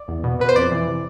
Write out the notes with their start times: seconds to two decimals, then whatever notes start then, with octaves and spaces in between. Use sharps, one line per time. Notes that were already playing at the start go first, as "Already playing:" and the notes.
Already playing: D5
0.08 E2
0.24 B2
0.40 B2 B4
0.49 C5
0.56 F2 D5
0.71 E3
0.87 C3